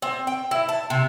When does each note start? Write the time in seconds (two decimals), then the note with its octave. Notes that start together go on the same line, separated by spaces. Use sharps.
0.02 C4
0.27 G5
0.51 E4
0.69 A5
0.90 C3